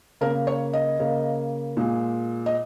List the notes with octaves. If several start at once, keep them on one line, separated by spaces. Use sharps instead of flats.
C#3 A#3 A#4
C#5
D#5
C#3 A#3
A#2 G#3
D#5